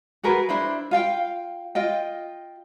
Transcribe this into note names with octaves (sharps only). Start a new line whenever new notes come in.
F#4 G#4 A#4 B4
D4 E4 C5 B5
F4 F5 G5
F4 D#5 G5